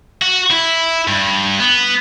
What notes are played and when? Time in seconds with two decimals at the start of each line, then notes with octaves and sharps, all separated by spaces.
0.22 F#4
0.51 E4
1.08 G2
1.60 B3